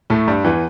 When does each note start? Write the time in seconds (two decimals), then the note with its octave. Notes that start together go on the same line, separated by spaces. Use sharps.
0.10 A2 A3
0.28 G2 G3
0.44 E2 E3